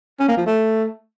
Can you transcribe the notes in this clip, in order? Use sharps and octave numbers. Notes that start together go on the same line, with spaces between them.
C#4
A#3
F3
A3